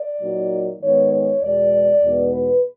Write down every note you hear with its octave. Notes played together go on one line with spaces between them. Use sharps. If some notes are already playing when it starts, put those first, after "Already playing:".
Already playing: D5
A#2 F#3 A#3 D#4
G#2 D#3 G#3 B3 D#4 C#5
C#5
E2 B2 G#3 D5
E2 B2 G#3 B3 D#4
B4